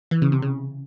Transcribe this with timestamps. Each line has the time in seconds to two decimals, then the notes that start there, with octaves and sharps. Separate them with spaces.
0.11 E3
0.22 C#3
0.32 C3
0.42 C#3